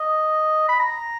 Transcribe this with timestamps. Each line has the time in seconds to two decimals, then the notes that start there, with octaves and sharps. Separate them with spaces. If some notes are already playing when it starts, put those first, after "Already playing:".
Already playing: D#5
0.69 B5
0.80 A#5